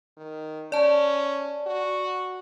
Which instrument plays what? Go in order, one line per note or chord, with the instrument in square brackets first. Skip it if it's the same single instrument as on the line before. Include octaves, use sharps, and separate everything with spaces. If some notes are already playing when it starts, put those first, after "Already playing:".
[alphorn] D#3
[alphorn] C#4 [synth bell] D5 A5
[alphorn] F#4